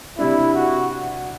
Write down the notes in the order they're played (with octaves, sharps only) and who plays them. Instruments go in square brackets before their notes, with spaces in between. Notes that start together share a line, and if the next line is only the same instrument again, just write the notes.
[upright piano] C3 G3 D4 [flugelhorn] E4
[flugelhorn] F#4